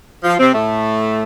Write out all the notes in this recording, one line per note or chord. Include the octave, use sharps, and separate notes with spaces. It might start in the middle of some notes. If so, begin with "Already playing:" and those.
F3 F4
C3 C4
A2 A3